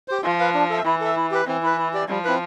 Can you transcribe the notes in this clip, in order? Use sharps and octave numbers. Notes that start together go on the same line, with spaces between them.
G4 C5
F3 F4
B4 F5
D4
A4 E5
E3 E4
A4 E5
E4
G4 B4
E3 C4
E4 B4
E4
G4 D5
F3 G3
C4 E4 B4